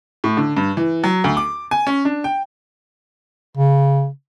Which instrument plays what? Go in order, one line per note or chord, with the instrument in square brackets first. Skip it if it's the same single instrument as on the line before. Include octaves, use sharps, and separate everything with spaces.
[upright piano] A2
D3
G2
E3
F#3
D2
D6
G#5
C#4
D4
G5
[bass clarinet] C#3